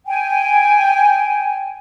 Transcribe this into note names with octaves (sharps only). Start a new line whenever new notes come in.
G5 G#5